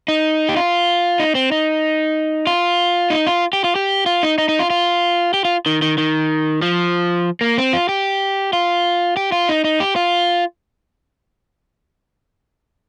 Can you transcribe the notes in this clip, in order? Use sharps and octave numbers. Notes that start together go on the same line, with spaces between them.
D#4
G4
F4
D#4
C4
D#4
F4
D#4
F4
G4
F4
G4
F4
D#4
D#4
D#4
F4
F4
G4
F4
D#3
D#3
D#3
F3
A#3
C4
F4
G4
F4
G4
F4
D#4
D#4
G4
F4